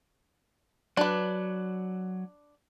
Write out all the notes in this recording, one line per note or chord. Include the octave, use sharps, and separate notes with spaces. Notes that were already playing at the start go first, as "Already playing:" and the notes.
F#3 D4 B4